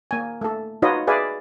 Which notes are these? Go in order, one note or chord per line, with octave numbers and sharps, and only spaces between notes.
A#3 G#5
A3 A4
D#4 F4 F#4 B4 C#5 D#5
G#4 B4 D5 E5 F5 G#5